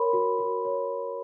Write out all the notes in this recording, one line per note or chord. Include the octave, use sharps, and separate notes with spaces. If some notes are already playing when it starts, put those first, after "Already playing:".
Already playing: A#4 C#5 B5 C6
F#4
F#4
C#5